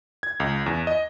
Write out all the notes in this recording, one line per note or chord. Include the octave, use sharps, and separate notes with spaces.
G#6
C#2
E2
D#5